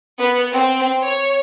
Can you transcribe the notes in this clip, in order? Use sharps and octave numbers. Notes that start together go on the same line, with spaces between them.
B3
C4
C#5